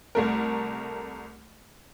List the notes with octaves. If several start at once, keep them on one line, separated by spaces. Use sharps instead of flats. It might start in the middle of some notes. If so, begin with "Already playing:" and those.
C2 A3 A#4